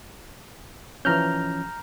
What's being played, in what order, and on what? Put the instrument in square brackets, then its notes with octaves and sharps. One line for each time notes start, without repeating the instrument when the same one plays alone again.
[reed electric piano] E3 F3 C#4 [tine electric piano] A#5 F6 G6